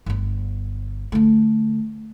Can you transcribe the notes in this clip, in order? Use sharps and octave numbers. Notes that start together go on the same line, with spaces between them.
G1 B3
D3 A3